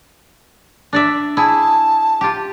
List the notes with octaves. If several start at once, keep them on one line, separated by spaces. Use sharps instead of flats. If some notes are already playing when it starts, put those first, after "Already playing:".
D4 D5 E5
E4 G#4 A5
F4 G4